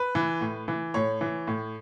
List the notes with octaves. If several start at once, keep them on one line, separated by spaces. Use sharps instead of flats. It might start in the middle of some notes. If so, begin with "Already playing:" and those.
Already playing: B4
E3
A2
E3
A2 C#5
E3
A2